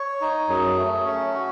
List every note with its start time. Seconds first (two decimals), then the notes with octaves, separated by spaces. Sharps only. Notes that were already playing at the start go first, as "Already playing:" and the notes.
Already playing: C#5
0.21 D#4
0.48 F#2 F#3 G#4
0.77 A3
1.06 C#4
1.34 F#4